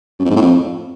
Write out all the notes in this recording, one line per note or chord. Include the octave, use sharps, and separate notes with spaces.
F#2
F2
G#2
A2
F2